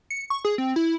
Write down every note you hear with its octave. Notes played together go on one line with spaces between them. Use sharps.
C#7
C#6
G#4
C4
E4